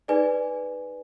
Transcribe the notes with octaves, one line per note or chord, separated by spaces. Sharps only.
D#4 G#4 B4 D5 G#5